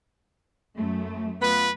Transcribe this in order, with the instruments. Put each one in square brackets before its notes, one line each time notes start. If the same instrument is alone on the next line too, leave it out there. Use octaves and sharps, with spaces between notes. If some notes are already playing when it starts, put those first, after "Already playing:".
[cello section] F#2 A3
[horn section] B3 F4 B4